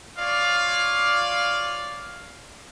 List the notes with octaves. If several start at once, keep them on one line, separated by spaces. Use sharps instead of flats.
F4 C#5 D5 F5